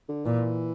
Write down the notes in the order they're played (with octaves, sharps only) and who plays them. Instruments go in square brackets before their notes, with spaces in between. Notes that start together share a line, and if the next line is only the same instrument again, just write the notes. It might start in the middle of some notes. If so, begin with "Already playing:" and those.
[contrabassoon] D3
[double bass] A#2 [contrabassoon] E3